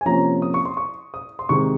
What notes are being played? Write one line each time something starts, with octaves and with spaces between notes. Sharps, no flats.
G#5
C3 F3 A#3 C#4 A#5
D#6
C#6
C6
C#6
D#6
C6
C3 D#3 G#3 C#6